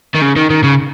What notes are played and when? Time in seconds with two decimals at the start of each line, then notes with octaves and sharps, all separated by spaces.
0.15 D#3
0.21 C#3
0.36 D#3
0.50 D#3
0.63 C#3